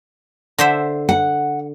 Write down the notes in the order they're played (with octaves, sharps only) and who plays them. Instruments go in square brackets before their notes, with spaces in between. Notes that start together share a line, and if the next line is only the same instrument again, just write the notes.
[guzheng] D3 C5 E5
[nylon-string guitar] F#5